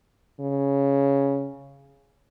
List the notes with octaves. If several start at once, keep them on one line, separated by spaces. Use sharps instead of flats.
C#3